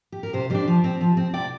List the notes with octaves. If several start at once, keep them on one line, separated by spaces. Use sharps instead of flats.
G4
A#4
C3 G4 C5
G3 D4 G4 C5
F3
C4
F3
C4
C3 D5 G5